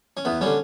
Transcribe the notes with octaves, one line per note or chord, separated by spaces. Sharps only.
C#4
E2 B3
D3 G3 C#4